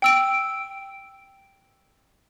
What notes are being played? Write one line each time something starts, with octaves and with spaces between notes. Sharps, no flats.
G5 E6 D7